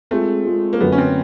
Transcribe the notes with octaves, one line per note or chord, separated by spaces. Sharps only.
G#3 A3 C4 F4 G#4
G#3 C4 F4 G#4
A#3
F#2 D3 F#3 A3 B3
C#4
C4